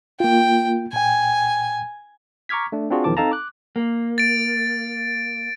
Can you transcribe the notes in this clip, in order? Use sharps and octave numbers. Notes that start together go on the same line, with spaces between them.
A#3 F4 G5
A#2 G5 G#5
A#5 C#6 D6 F6 G#6 B6
A3 D4
C4 D4 F4 F#4 G#4
B1 E2 D#3 F3 A5 D6
C4 D#4 A4 F5 A5 A#5
D6 F#6
A#3
A6 D7